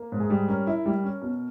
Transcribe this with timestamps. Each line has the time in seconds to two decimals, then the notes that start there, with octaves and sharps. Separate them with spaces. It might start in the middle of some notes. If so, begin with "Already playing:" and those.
Already playing: A#3
0.12 G#2
0.20 G#4
0.30 G3
0.48 C#4 A#4
0.67 E4
0.86 G3
1.04 C#4
1.22 B2